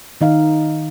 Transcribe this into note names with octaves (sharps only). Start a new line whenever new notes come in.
D#3 D#4 F5